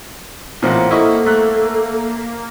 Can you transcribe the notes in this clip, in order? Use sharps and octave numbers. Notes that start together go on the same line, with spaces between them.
A1 A#2 C5 F#5
A#3 E4 A4 D#5 C#6
A3 F#6